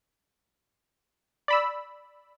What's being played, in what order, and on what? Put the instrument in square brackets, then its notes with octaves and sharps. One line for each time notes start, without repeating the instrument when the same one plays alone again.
[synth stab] D5 B5 E6